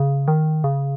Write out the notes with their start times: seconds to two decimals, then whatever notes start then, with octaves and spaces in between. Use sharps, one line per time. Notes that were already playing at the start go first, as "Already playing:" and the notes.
Already playing: C#3
0.28 D#3
0.64 C#3